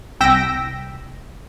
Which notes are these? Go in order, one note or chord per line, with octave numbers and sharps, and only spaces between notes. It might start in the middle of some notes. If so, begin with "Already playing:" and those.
C2 G5 E6 A#6 B6 D7